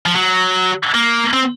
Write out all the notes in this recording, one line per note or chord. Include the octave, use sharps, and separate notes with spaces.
F3
F#3
A#3
C4